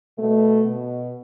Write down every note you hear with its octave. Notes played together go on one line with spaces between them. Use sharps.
B2 A3
B2